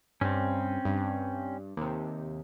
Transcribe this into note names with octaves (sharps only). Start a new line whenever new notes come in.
G2 C4 C#4
G2
D#2 C3